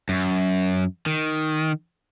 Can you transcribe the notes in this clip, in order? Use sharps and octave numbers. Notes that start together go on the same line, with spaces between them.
F#2
D#3